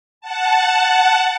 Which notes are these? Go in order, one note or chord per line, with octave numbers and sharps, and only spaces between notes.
F#5 A5